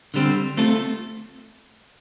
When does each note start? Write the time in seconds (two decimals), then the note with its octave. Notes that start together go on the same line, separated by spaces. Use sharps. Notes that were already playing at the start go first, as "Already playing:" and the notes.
0.14 D3 G3 C4
0.57 A3 C4 F4 A4